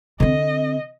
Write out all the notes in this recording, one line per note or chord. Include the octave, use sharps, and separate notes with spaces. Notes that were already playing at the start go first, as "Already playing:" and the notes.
D3 C4 D#5